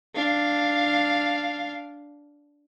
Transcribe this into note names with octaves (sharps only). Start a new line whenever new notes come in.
D4 F5